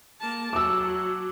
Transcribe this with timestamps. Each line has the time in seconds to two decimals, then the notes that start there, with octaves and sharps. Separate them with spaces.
0.20 A#3 A5
0.53 F#3 D6 E6